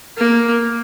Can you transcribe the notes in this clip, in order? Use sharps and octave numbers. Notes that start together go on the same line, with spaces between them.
A#3